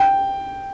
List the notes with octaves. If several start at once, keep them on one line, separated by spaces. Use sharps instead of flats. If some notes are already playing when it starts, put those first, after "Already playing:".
Already playing: G5